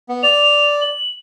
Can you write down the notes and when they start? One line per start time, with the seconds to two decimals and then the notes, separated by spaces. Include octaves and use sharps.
0.09 B3
0.23 D5 F7
0.81 F#7